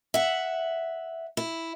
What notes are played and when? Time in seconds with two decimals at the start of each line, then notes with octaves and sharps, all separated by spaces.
0.14 E5 F#5
1.37 E4